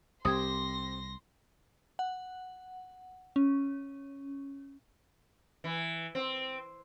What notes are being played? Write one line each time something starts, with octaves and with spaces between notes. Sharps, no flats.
C2 C4 G4 C6 D#6 G#6 A#6
F#5
C#4
E3
C4